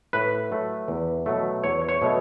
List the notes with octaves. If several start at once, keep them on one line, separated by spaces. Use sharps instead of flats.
A2 B4
F#3 A3
E2
B2 F#3 A3
E2 C#5
C#5
B2 F#3 A3